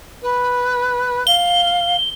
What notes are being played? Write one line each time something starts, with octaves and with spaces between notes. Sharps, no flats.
B4
F5 G7